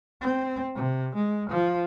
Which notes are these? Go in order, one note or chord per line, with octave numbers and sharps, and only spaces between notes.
C4
C3
G#3
F3